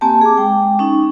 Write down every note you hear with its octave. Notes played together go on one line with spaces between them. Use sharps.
A#3 C4 G4 G#5 A5
G#4 D6
G#3 G5
C#4 D#4